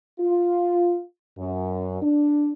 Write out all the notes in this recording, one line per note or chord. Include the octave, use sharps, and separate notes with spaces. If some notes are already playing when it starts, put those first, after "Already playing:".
F4
F#2
D4